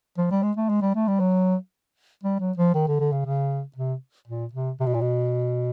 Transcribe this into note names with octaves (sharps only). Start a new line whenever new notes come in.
F3
G3
G#3
A3
G#3
G3
A3
G3
F#3
G3
F#3
F3
D#3
D3
D3
C#3
C#3
C3
A#2
C3
C3
B2
A#2
B2